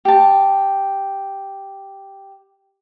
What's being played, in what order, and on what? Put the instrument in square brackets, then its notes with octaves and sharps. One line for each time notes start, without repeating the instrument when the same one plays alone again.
[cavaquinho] G4 A5